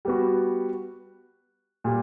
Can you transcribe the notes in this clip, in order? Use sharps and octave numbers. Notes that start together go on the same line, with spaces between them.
G3 B3 F#4
A#2 G3